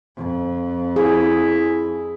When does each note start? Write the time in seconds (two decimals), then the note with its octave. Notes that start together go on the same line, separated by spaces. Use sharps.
0.17 F2
0.96 E4 G#4